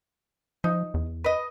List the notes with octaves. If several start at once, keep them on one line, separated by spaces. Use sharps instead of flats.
F3 D#4
E2
B4 D#5